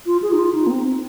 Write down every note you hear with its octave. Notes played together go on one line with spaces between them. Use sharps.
F4
G#4
D#4
F4
D#4
A#3
C4